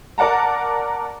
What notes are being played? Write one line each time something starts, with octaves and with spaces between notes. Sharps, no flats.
A#4 D5 F#5 A5 A#5